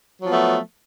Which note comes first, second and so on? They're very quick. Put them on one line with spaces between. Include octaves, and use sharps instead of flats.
F#3 F3 B3 A3